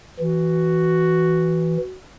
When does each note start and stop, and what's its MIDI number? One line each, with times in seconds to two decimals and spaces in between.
0.19 1.77 52
0.19 1.95 66